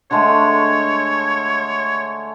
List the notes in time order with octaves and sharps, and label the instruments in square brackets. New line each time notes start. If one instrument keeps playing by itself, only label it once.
[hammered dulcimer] D3 G#3 A3 [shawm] C#5